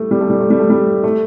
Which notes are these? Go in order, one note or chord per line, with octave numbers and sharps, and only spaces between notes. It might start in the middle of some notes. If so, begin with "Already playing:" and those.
Already playing: G3 A3
G3
A3
G3
A3
G3
A3
G3
A3